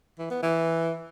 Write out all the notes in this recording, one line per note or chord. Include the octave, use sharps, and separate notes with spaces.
E3
B3
E3